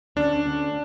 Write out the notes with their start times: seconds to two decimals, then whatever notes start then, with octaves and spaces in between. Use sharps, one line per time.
0.16 D2 D3 F#3 C#4 D4
0.46 D2 D3 F#3 C#4